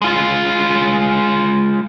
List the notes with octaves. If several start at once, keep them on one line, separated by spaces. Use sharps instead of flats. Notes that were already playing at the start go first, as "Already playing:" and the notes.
G#3 F4